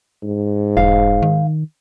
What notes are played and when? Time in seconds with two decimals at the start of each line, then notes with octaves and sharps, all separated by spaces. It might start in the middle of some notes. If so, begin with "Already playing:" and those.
0.23 G#2
0.77 E1 F5
1.22 D#3